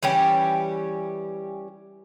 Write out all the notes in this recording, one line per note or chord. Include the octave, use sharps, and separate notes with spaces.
E3 G3 C#4 G4